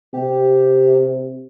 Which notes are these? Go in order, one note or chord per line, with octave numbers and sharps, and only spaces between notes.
C3 G4